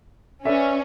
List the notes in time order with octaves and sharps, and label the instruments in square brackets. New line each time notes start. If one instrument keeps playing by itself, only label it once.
[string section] C#4 [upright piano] B4 D5 E5